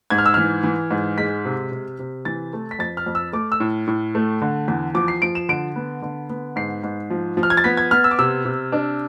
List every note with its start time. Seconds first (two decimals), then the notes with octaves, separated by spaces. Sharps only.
0.10 G#2 G#6
0.18 F6
0.26 E6
0.34 E3 F6
0.63 E3
0.91 G#2
1.18 G#3 B6
1.45 C3
1.72 C3
1.99 C3
2.25 E3 A6
2.53 A3
2.71 B6
2.79 F2 A6
2.97 F6
3.06 F2
3.15 E6
3.33 A3 D6
3.52 E6
3.60 A2
3.87 A2
4.15 A3
4.42 D3
4.68 E2
4.94 F3 D6
5.08 C7
5.22 F3 D7
5.35 E7
5.49 D3 D7
5.76 B3
6.02 D3
6.30 B3
6.56 G#2 C7
6.83 G#2
7.10 F3
7.37 F3
7.43 F6
7.50 G#6
7.57 A6
7.64 B3 B6
7.77 G#6
7.91 B3 F6
8.04 E6
8.11 D6
8.19 C3 E6
8.45 C3
8.72 D4